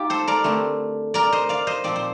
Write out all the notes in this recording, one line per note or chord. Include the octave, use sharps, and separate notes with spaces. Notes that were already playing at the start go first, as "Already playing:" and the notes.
Already playing: D#4 F4 G4
A4 C5
A#4 D5
D3 A3 C4
A#4 D5
C5 D#5
D5 F5
C5 D#5
A#2 F3 C4 D5
C5